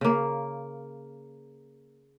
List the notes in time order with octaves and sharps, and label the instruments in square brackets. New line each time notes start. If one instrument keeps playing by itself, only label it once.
[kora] C#3 A#3